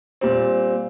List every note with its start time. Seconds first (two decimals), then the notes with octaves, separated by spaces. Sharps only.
0.21 A#2 G3 C4